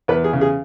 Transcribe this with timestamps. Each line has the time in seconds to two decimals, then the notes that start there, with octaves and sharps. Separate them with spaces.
0.08 E2 B4
0.24 G#4
0.33 C#3
0.41 G#4